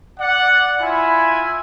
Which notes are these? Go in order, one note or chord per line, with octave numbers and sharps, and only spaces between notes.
D5 F#5
E4 F4 E5 G#5 B5